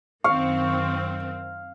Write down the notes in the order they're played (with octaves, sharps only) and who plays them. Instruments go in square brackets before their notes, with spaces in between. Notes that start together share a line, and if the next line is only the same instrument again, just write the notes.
[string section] F#2 D#3 C4 [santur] F5 [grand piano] C#6